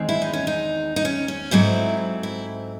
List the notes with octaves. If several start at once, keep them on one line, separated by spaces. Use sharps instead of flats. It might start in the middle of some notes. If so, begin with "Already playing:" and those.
Already playing: E2 D#3 G#3 C4
E4
D#4
C#4
D#4
D#4
C#4
C#4
G#2 F#3 A3 C4 E4
E4